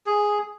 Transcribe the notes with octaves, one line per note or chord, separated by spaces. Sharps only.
G#4